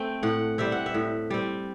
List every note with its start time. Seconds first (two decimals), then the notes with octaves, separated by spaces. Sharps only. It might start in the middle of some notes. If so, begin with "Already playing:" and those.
Already playing: A3 C4 G5
0.23 A2 F#5
0.58 G3 C4 E5
0.72 F#5
0.86 E5
0.94 A2
1.30 G3 C4